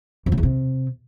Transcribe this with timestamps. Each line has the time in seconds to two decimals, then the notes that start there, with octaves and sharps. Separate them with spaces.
0.26 F2
0.32 C#3
0.37 E2
0.43 C3